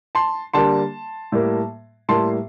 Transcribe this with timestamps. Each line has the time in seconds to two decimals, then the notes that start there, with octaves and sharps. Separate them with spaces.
0.15 A5 C6
0.54 D3 G3 A#3 A5 C6
1.32 A2 G3 A#3
2.09 A2 G3 A#3 A5 C6